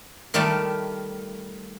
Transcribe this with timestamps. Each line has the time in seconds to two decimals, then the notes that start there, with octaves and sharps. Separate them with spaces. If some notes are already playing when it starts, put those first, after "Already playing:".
0.34 D#3 G3 A3 A#4 D5 A5